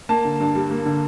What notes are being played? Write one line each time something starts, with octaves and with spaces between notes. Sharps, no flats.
A#3 A5
D3
G2
G3
A#3
D3